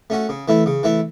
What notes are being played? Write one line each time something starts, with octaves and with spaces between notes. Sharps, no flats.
A3 C#4 F#4
C#3
E3 A3 E4
C#3
E3 A3 E4